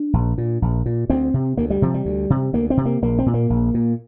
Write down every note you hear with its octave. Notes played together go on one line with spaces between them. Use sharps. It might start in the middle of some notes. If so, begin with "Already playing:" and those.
Already playing: D4
A#1
A#2
A#1
A#2
D2 C4
C3
D2 A#3
G3
C3 F3
G3
D2
C3
D2 A#3
C4
C3
A#3
A#1 A#3
C4
A#2
A#3
A#1
A#2